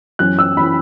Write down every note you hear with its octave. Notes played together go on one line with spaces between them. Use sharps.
F#2 E3 C#4 F#6
E6
E3 C#4 B5